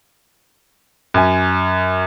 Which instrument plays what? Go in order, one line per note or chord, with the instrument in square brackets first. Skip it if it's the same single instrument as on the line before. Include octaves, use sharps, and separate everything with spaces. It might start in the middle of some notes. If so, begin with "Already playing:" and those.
[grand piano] F#2 G#5